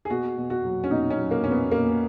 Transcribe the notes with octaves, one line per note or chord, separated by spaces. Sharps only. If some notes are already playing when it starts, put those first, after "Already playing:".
G#4
B2 F#4
B2
F#4
F#3
C#4
B2 D#4
C#4
F#3
A#3
B2 C#4
B3
B2 A#3